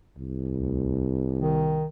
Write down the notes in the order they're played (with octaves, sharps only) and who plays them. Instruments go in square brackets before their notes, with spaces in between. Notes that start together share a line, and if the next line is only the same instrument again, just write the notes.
[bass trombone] C2
[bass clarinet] D2
D#3